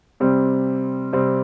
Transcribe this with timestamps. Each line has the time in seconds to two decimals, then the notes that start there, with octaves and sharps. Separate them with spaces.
0.20 C3 G3 C4
1.13 C3 G3 C4